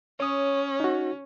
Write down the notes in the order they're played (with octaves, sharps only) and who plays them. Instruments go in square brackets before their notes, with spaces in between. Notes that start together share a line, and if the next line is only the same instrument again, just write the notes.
[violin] C#4 [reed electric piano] C#5 D#6
[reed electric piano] D#4 F#4